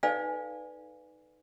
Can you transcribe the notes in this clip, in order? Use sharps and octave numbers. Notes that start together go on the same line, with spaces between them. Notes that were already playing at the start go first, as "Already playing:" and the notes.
D#4 A4 B4 D5 F5 G#5